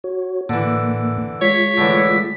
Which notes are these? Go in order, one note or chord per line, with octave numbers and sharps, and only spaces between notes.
F#4 C#5
A2 D3 E3 A#3
G#3 F4 C#5 B6
A2 D3 E3